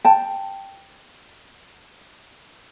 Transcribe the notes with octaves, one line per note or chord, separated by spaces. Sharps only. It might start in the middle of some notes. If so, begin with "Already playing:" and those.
G5 A5